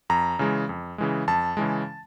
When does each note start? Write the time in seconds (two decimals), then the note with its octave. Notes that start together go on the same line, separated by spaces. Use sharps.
0.10 F2 A#5
0.39 C#3 E3 G#3
0.69 F2
0.98 C#3 E3 G#3
1.28 F2 A5
1.57 C#3 E3 G#3